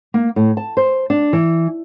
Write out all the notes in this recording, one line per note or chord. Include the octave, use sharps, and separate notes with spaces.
A#3
A2
A5
C5
D4
E3